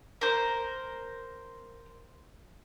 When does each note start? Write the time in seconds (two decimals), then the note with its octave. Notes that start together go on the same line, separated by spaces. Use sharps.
0.21 A#4 C5